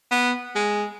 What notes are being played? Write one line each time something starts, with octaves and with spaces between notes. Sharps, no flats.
B3
G#3